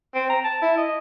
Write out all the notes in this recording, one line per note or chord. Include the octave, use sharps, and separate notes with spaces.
C4
A#5
A5
E4
D#5